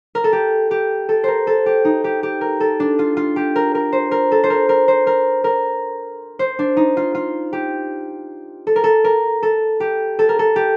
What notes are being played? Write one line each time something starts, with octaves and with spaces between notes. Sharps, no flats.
A#4
A4
G4
G4
A4
A#4 C5
A4
G4
D#4
G4
G4
A#4
A4
D4
F4
F4
G4
A#4
A#4
C5
A#4
A4
C5
A#4
A#4
C5
A#4
A#4
C5
D4
D#4
F4
F4
G4
A4
A#4
A4
A#4
A4
G4
A4
A#4
A4
G4